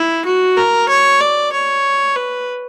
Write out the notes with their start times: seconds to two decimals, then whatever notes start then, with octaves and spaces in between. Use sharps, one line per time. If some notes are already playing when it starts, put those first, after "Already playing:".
Already playing: E4
0.25 F#4
0.57 A#4
0.89 C#5
1.20 D5
1.53 C#5
2.16 B4